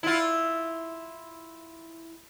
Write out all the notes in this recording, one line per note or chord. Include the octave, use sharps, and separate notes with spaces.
E4 F4